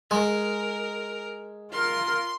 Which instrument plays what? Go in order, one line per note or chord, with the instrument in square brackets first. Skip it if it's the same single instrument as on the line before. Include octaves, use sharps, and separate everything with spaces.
[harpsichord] G#3 [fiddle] A#4
[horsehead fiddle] F4 A#4 [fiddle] C6